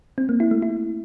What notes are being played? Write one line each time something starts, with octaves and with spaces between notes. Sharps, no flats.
C4
A#3
E4
A3
E4